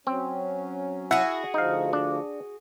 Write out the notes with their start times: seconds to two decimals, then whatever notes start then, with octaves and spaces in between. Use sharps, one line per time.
0.07 F#3 C4 C#4
1.11 E4 F#4 G#4 E5 F#5
1.54 D2 F3 D#4 F5
1.93 D4